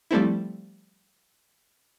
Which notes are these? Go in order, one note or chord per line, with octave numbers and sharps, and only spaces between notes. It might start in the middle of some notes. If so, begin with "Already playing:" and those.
F3 G3 A3 C4 E4